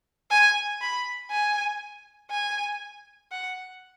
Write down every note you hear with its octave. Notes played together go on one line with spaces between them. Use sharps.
G#5
B5
G#5
G#5
F#5